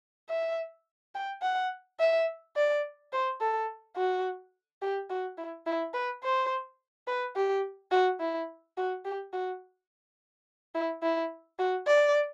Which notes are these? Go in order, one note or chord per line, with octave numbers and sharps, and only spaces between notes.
E5
G5
F#5
E5
D5
C5
A4
F#4
G4
F#4
E4
E4
B4
C5
B4
G4
F#4
E4
F#4
G4
F#4
E4
E4
F#4
D5